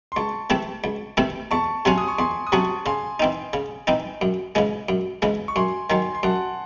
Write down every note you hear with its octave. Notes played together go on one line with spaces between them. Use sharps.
C6
C#2 A5 C#6
C3 E3 A3 C4
C#2
C3 E3 A3 C4
E2 A5 C#6
C3 F#3 C#4 F#4 G#5 C6
D#6
C#6
E2 G#5 C6
D#6
C3 F#3 C#4 F#4 A5 C#6
C#3 G#5 C6
E3 C4 D#4
C#3
E3 C4 D#4
F#2
C#3 E3 G#3
F#2
C#3 E3 G#3
C#6
F#2 G#5 C6
D#3 F#3 G#5 C6
C6
F#2 F#5 A5